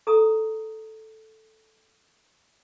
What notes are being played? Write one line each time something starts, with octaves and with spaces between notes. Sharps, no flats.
A4 A#5 D#6